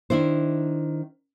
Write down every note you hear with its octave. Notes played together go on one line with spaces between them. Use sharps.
D#3 D4 E4 C5